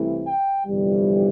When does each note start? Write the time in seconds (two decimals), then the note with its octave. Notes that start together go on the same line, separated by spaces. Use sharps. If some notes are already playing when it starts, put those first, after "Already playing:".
Already playing: C2 C3 E3 A3 E4
0.26 G5
0.67 G1 F2 C3 E3 G3